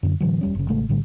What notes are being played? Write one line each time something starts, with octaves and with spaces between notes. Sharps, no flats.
F#2 D3
A2 D3 E3 F#3
E1 G3 C#4
F#1 C#3
A1 C#3 G#3 A3
A#1 A2 D3 G3